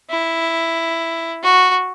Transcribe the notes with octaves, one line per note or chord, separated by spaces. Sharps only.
E4
F#4